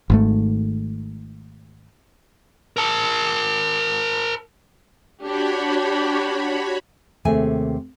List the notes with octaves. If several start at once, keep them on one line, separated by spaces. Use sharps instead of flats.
G#1 G#2 A3
A#4 A5
D4 F#4 G4 C#5 B5
D#2 C3 A3 G#4 G#5